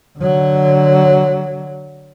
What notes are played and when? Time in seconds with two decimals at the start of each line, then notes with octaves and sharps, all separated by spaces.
0.19 D3 F#3